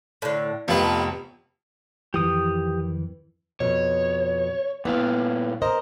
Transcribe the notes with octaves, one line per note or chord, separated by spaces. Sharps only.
A2 D3
F1 F2 B3 C4 B4 F5
F2 D#3 E3 G4 D#6
F2 B2 C#5
A#2 B3 E4 F5
A#4 C5 D#5